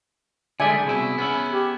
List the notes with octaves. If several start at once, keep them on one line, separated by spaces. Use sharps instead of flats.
D3 G3 G#3 D5 E5 G#5
C2 B2 E4 G#4
B3 C#4 E4
G4